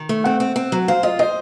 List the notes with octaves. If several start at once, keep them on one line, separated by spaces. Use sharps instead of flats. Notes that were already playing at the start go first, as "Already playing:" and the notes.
Already playing: D#3
A3
C4 F#5
C4
C4
F#3
C5 F5
F4 D#5
C5 D#5